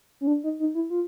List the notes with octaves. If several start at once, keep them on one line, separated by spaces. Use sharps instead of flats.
C#4
D4
D#4
D#4
E4
F4